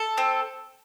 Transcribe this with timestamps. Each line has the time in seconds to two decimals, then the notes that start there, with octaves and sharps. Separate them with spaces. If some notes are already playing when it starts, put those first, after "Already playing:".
Already playing: A4
0.18 C4